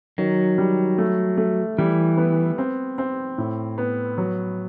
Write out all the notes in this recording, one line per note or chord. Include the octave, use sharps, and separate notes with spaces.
D#3 F#3
G3
A3
A3
E3 G3
B3
C4
C4
A2
B3
F#3